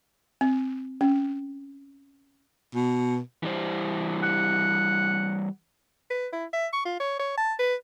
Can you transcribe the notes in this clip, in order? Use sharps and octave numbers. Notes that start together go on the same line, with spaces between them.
C4
C#4
B2
E3 G3 C5
F#5
B4
E4
E5
C#6
F4
C#5
C#5
A5
B4